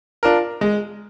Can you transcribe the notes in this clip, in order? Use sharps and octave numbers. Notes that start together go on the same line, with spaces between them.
D4 F4 A#4
G#3